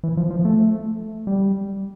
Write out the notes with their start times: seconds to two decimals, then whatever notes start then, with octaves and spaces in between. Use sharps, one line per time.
0.03 E3
0.17 F3
0.30 F3
0.45 A3
1.27 G3